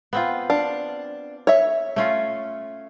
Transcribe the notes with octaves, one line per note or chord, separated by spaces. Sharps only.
B3 C4 F4
D4 F5
C#5 E5
A3 C#4 F4